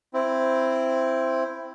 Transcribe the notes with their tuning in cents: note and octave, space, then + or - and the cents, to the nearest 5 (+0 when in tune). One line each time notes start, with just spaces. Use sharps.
C4 +0 E4 +10